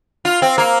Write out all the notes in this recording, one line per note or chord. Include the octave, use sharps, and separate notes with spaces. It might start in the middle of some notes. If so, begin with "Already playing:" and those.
F4
C4
A#3